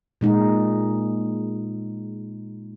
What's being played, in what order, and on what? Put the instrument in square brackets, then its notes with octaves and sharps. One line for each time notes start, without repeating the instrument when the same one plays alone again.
[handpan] A#2 G#3 D#4